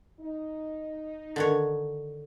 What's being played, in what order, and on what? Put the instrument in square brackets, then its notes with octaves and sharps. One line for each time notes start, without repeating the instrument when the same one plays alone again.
[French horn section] D#4
[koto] D3 D#3 C#5